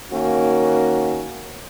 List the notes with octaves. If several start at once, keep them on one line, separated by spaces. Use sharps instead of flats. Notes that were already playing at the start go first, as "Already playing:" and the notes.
D#3 A#3 C#4 F#4